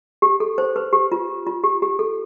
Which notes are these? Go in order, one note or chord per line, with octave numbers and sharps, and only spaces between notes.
G4
A4
C5
B4
G4
F4
F4
G4
G4
A4